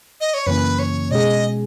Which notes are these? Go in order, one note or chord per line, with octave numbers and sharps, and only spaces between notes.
D#5
C#5
F#2 C#3 E3 A#3 C#4 B4
C#5
B2 G#3 C#4 G#4 D#5